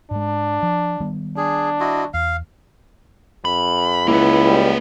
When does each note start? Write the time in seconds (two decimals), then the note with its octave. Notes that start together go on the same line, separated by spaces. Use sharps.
0.11 G#2 G#3 D4
0.63 F3
1.00 D#3 G3 B3
1.37 D4 G#4
1.80 E4 F#4 D#5
2.14 E2 F5
3.45 F2 B5
4.08 C#2 A#3 E4 B4
4.47 G3